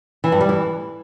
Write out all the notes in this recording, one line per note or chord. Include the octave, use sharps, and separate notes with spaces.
E3
G2
G3
E3